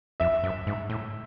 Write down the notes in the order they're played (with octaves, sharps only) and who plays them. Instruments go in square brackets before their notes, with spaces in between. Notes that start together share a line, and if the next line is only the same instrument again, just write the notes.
[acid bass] F2 [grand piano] E5
[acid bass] F#2
G#2
A2